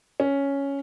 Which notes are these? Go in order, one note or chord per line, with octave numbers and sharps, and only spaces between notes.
C#4